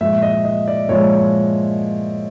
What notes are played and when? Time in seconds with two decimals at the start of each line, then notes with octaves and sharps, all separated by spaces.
0.01 A#2 F3 G#3 E5
0.22 D#5
0.45 D#5
0.68 D5
0.89 A#2 F3 G#3 C#5